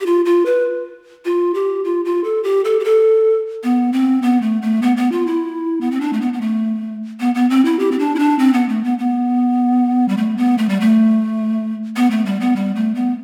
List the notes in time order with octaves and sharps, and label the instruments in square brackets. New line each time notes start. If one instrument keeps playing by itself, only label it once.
[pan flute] G4
F4
F4
B4
F4
G4
F4
F4
A4
G4
A4
G4
A4
B3
C4
B3
A3
A3
B3
B3
F4
E4
B3
C4
D4
A3
B3
B3
A3
B3
B3
C4
E4
G4
C4
D4
E4
D4
C4
B3
A3
B3
B3
G3
A3
B3
A3
G3
A3
B3
A3
G3
B3
G3
A3
B3